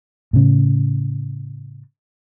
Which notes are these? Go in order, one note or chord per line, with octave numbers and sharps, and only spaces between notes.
A2 C#3